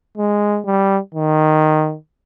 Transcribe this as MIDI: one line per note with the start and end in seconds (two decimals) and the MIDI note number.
0.18 0.60 56
0.66 0.99 55
1.14 1.95 51